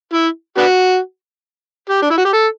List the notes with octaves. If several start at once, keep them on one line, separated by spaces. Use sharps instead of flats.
E4
B3 D4 F#4
G4
D4
E4
F#4
G4
A4